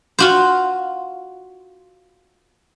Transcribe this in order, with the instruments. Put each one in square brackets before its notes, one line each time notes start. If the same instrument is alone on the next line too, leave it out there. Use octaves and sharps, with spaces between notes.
[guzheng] F4 F#4 C5